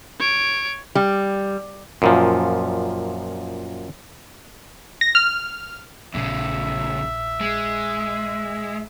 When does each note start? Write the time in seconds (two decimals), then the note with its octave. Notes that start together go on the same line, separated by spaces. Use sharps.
0.19 C#5 D7
0.95 G3
2.02 F#2 A#2 F3
5.01 A#6
5.15 F6
6.14 A#1 E2 C#3 E5
7.41 G#3